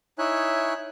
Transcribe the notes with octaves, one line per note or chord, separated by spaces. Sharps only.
D#4 E4 C#5 E5 G#5 F#6